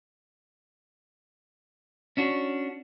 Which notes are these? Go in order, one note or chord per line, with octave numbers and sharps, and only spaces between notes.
C#4 D4 F#4